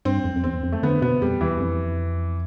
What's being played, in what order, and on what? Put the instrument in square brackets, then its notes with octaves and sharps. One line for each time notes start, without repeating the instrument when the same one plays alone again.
[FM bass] G2 [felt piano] C4
[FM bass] F2
F2
[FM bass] E2 [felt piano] C4
[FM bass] F2
[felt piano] A3
[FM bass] D3 [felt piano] B3
[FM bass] B2 [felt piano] B3
[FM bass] F2 [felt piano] G3
[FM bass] E2 [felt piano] E3
[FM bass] F2